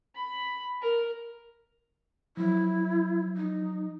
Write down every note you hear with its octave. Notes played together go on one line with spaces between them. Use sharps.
B5
A#4
F3 F#3 E4
D#4